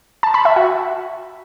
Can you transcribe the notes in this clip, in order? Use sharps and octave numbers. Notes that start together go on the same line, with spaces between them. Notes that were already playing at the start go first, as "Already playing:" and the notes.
A5
B5
E5
F#4